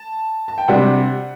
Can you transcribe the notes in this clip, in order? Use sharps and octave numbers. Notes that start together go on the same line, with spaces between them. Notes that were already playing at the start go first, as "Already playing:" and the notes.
Already playing: A5
A5
G5
C3 G3 D4 F#5